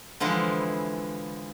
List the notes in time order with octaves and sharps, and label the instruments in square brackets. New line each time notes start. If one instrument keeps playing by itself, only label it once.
[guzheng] D3 E3 F3 G#3 E4